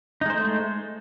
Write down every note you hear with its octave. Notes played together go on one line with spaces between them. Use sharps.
G#3 A3 D#4 C5